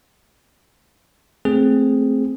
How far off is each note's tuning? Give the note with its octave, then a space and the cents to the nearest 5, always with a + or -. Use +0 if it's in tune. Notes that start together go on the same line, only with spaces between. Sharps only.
A3 +0 C4 +0 G#4 +0